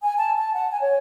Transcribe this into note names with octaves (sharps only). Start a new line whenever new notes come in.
G#5
A5
A5
F#5
G#5
C#5